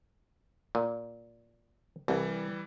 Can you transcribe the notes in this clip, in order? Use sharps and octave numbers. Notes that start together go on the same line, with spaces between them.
A#2
C2 E3 G3